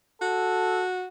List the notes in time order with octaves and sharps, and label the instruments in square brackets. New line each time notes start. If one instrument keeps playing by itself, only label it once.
[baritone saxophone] F#4 [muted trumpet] A4